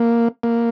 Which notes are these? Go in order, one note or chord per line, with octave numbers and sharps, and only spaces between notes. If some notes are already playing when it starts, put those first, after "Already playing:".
Already playing: A#3
A#3